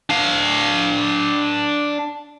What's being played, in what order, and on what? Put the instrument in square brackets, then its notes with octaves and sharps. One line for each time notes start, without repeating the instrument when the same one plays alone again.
[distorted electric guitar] D4 F5